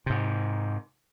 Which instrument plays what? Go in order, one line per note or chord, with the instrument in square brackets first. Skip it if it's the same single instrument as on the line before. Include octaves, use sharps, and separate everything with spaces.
[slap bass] G#2 C3